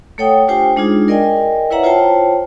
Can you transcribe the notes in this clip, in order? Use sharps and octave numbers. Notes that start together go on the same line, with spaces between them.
A3 A4 C#5 F#5 G5 D#6
D4 F4 G4 C5 G5 G#5
G#3 D4 D#4 F4 G#4
A#4 D5 D#5 G5 G#5
E4 B4 C#5 E5 F#5 A#5
F4 C5 C#5 G5 A5